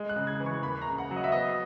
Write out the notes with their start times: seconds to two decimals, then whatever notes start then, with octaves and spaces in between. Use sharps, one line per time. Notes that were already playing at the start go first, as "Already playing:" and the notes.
Already playing: G#3
0.09 F#6
0.16 C#3
0.27 G#6
0.40 E3
0.46 C#6
0.63 D#2 B5
0.82 A#5
0.87 C#3
0.98 F#5
1.11 F#3
1.16 D#5
1.24 E5
1.32 B3 D#5